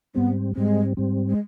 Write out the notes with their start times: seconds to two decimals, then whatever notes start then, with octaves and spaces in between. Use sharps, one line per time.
0.15 G#2 G3 B3 C4
0.55 G#2 G3 G#3 C4
0.97 G#2 G3 C4
1.29 G#3